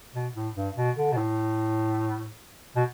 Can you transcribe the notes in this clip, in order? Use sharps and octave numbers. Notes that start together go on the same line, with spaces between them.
B2
A2
G2
B2
D3
B2
A2
B2